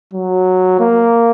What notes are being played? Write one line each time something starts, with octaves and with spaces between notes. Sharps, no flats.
F#3
A#3